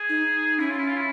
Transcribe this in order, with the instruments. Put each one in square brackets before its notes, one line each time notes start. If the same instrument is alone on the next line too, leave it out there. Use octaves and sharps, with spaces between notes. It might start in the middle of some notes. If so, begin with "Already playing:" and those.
Already playing: [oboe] G#4
[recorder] D#4
[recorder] C#4 [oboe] E4
[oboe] F4
E4
F4
E4